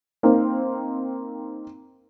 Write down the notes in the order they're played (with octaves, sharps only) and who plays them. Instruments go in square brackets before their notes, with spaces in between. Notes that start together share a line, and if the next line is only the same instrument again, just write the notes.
[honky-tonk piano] A#3 C4 D#4